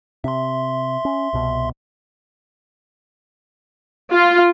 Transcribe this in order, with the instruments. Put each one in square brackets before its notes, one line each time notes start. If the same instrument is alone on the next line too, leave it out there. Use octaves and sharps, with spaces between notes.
[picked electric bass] C3 [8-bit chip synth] E5 C6
[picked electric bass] C#4
C2 B2
[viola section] F4